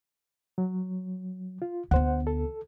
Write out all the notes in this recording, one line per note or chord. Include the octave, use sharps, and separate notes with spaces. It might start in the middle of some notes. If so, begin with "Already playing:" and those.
F#3
F4
D2 B3 C5 F#5
A4